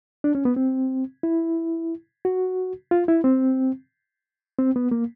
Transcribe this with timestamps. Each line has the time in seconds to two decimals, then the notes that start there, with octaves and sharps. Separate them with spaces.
0.24 D4
0.35 C#4
0.45 B3
0.56 C4
1.23 E4
2.25 F#4
2.91 F4
3.08 E4
3.24 C4
4.58 C4
4.76 B3
4.92 A#3